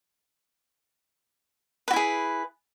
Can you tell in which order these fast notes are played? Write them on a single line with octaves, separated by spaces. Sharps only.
B4 F#4 E4 G#4